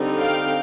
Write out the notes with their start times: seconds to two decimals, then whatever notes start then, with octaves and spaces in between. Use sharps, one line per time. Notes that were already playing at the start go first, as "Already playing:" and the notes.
Already playing: D3 G3 C4 D#4
0.21 F5 G5